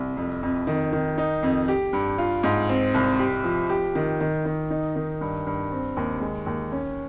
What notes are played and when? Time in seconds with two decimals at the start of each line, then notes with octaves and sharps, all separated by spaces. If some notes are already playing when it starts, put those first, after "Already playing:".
Already playing: C2
0.17 F2
0.43 F2
0.67 D#3
0.93 D#3
1.18 D#4
1.43 F2
1.68 G4
1.93 G2
2.18 F4
2.43 G#2
2.69 C4
2.94 C2
3.19 G4
3.44 F3
3.70 G4
3.95 D#3
4.20 D#3
4.45 D#3
4.70 D#4
4.96 D#3
5.21 G2
5.46 G2
5.72 C4
5.97 D#2
6.21 G#3
6.46 D#2
6.72 C#4